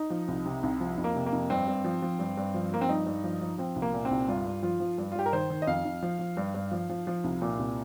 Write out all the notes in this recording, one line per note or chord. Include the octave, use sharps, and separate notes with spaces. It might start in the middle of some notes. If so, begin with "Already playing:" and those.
Already playing: D#4
F3
C2
C3
C2
F3
F2
A#3
C3
A#3
F2
G2 C4
G2
F3
F3
G2
G2
F3
F3 A#3
C4
G2 D#4
G2
F3
F3
F3 C4
C2
A#3
A#2
C4
C2
G2 F4
G2
F3 F4
F3
G2
F4
G2 G4
A#4
D#3 C5
D#3
D#5
F2 F5
F2
F3
F3
G2
G2
F3
F3
F3
C2
A#2
C2